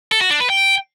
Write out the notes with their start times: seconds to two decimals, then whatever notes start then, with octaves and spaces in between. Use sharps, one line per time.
0.12 A4
0.21 F#4
0.31 D4
0.40 B4
0.50 G5